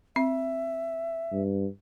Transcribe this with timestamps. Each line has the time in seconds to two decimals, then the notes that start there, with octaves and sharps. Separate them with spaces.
0.16 C4 E5
1.32 G2